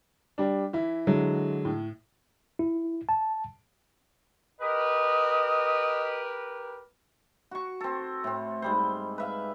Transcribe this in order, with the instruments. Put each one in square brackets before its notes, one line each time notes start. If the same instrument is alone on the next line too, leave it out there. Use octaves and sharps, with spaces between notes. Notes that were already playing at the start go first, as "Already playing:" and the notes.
[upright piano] G3 D4
E3 E4
[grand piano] D3 F#3 G#3
[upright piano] A2
[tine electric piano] E4
A5
[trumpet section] G4 A#4 B4 [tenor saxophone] D#5
[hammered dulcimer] F#4 C#6
C4 A4
A2 C4
G#2 G3 C5
B4 E5 F5